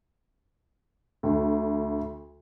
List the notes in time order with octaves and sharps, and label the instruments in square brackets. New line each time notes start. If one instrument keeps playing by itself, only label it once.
[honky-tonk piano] D2